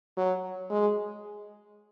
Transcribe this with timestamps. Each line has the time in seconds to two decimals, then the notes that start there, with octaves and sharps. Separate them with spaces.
0.17 F#3
0.70 G#3